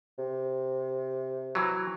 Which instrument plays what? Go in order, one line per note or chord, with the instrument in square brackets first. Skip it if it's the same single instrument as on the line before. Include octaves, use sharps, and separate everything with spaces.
[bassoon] C3
[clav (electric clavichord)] E3 F#3